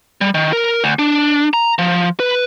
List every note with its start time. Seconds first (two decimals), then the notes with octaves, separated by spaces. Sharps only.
0.21 G3
0.34 D#3
0.53 A#4
0.84 D2
0.99 D4
1.53 A#5
1.79 F3
2.20 B4